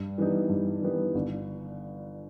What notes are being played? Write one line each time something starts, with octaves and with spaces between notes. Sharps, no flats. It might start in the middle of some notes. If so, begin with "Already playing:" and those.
Already playing: G2
E3 G3 B3 D#4
G2
E3 G3 B3 D#4
G1